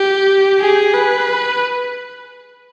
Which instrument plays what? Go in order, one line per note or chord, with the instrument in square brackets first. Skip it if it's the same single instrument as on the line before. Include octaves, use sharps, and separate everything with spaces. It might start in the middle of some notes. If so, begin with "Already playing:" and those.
Already playing: [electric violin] G4
G#4
B4